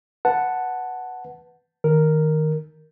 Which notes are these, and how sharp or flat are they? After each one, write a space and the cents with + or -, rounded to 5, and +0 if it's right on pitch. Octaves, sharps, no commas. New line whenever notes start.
B4 +0 F#5 +0 A5 +0
D#3 +0 A#4 +0